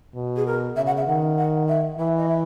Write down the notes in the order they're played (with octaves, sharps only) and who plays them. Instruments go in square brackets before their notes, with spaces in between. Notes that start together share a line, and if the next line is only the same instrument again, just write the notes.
[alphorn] B2
[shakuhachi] G#4
A#4
[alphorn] C#3 [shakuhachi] E5
[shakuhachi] F#5
E5
[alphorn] D#3 [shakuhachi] F#5
[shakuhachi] F#5
E5
[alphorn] E3 [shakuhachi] E5
[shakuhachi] D#5
E5